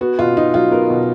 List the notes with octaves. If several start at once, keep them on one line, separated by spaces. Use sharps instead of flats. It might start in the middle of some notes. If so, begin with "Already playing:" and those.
B3 F#4
B2 F4
B2 D#4
F#3 F4
B3 A#4
B2